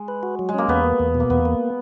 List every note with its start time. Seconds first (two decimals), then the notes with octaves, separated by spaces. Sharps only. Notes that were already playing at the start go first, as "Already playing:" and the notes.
Already playing: G#3
0.08 B4
0.23 F#4
0.39 F#3
0.49 G#3
0.54 A#3 C#4
0.68 E2 B3
0.84 A#3
0.99 E2
1.15 B2
1.20 A#3
1.30 E2 B3
1.45 A#3